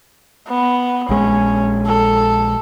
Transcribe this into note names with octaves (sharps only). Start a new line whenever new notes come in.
B3
A#1 G#3 C#4
A4